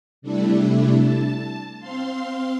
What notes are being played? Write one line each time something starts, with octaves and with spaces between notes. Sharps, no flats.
C3 G3 A3 D4 E4
A5
C4 F5 C6